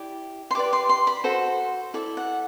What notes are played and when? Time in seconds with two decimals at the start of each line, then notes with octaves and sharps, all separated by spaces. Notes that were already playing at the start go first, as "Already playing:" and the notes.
Already playing: E4 G4 D5
0.51 C6
0.55 G4 B4 D5 D6
0.73 C6
0.89 C6
1.07 B5
1.24 F#4 A4 C5
1.94 E4 A4 D5
2.17 F#5